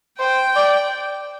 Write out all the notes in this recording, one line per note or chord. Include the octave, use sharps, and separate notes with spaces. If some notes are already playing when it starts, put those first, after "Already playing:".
C5 G5
D5